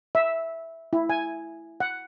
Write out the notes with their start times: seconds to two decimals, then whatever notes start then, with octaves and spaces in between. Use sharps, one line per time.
0.15 E5
0.93 E4
1.09 G#5
1.80 F#5